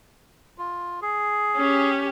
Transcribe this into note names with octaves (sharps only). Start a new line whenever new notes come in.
F4
G#4
C#4 G4